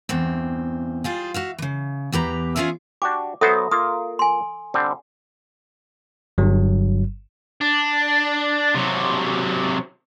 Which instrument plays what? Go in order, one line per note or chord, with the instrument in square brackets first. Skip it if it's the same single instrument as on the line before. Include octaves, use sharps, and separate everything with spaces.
[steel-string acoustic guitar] E2 G2 C4
G3 F4 G#4
F#4 E5 F5
C#3 E3
E2 G4 B4 A#5
C#4 D4 F4 G#4 E5 F5
[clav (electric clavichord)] D4 F#4 G4 [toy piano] D6
[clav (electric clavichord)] F#3 B3 C5 [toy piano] A4 E5 D#6
[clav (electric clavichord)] A#3 F4 A#4 [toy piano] D#6
[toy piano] G#5 C6
[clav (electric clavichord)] D3 G3 C4
[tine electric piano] G1 G2 F#3
[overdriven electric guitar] D4
C3 F#3